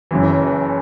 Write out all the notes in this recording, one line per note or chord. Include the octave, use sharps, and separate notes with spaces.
F#1 F#2 E3